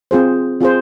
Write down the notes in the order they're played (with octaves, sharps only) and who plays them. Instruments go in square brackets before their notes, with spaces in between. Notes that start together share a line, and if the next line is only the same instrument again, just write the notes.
[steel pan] C4 F4 G#4 C5
C4 F4 G#4 C5